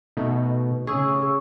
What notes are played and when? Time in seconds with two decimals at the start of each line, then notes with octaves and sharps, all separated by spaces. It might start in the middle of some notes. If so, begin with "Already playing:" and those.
0.17 B2 A3 D#4
0.87 C#3 G#4 C#6 E6